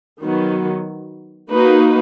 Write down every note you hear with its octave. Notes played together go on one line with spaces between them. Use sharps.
D#3 F#3 B3
A#3 D#4 F#4 B4